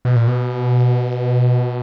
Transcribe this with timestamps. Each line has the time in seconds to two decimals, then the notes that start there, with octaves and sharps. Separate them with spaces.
0.05 B2
0.16 A#2
0.27 B2